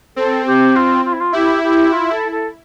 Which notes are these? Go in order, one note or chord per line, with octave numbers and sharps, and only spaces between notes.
C4 A4
G4
F4
F4
E4
F4
E4 G4
G4
F4
A4
A4